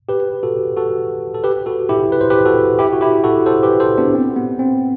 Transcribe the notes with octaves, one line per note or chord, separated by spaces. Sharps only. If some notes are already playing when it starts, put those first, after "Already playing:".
G4 B4
F#4 A4
F#4 A4
A4
G4 B4
F#4 A4
E4 G4
B4
C5
G4 B4
F#4 A4
E4 G4
F#4
E4 G4
F#4 A4
A4 C5
G4 B4
A4 C5
B3 D4
C4
B3
C4